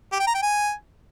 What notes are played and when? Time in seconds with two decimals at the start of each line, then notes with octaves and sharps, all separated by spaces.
0.12 G4
0.20 G5
0.27 A#5
0.35 G5
0.42 G#5